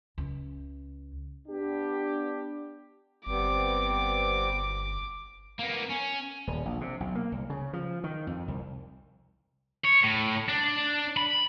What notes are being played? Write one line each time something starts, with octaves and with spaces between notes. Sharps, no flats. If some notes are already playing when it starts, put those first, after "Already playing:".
C#2
B3 D4 G4
G1 G3 B3 C4 D6
A#3 B3
C#4
D#1
A#1
C3
B1
A#3
C2
C#3
F3
D#3
F2
C2
C#5
A2
D4
B5